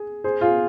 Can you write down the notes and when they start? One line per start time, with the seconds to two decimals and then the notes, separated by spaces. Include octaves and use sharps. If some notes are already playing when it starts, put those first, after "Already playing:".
Already playing: G#4
0.24 G#4 C5
0.41 F4 G#4